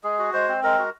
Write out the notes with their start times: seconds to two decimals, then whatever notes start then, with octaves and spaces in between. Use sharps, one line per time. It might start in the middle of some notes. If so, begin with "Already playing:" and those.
0.04 G#3 G#4
0.19 F#4
0.33 G#3 C5
0.49 C4
0.63 G#3 A#4
0.79 F#4